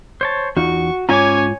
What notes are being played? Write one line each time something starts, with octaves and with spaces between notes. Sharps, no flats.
C5 C#5 A5
E2 D#4 F4 F#4 C#6
G#2 C#4 F4 C#5 G#5 A#5 D6